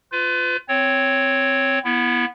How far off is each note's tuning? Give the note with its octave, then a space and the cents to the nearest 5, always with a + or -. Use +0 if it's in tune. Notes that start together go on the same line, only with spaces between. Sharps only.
F4 +0 B4 +35
C4 +0 C#5 +0
B3 -20 E4 +15